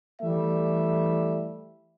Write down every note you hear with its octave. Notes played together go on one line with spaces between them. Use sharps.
E3 G3 A3 E5